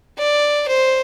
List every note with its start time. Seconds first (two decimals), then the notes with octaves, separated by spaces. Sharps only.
0.18 D5
0.68 C5